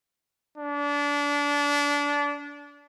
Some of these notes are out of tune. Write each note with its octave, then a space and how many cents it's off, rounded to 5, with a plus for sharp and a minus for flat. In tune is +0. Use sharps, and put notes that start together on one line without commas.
D4 -25